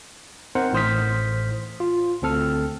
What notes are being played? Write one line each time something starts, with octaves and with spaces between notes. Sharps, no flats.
C4 D#4 A#4 C5 F#5
A1 A2 C5 D#6 F6 B6
F4
D2 C4 A4 F6